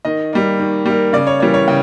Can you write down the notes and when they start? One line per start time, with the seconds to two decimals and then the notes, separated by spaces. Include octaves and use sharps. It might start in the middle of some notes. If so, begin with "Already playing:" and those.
0.05 D#3 D#5
0.33 G3 A#3
0.60 D#3
0.86 G3 A#3
1.13 C#3 D5
1.27 C#5
1.40 E3 G3 A#3 C#5
1.54 C#5
1.68 C#3 G5